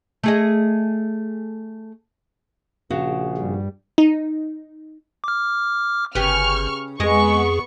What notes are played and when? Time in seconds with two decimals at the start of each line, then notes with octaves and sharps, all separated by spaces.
0.23 A3 G#4 D#5
2.90 A#1 C#3 F#4
3.37 G2 G3
3.98 D#4
5.24 D6 F6
6.15 G1 C#3 G4 B4 C#6 F6
7.00 F2 G#3 B3 G#4 D#5 C#6